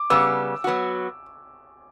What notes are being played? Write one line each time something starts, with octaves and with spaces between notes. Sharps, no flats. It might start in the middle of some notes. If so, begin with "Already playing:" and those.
Already playing: D6
C#3 G3 B3 E6
F#3 B3 F#4